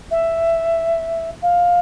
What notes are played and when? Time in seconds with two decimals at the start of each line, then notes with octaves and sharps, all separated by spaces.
0.11 E5
1.42 F5